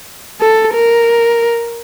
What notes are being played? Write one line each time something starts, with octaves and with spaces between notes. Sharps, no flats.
A4
A#4